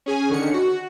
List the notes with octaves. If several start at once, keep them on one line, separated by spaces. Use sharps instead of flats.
C#4 G#4 G#5
D3 D#3 C#4 C#7
F#4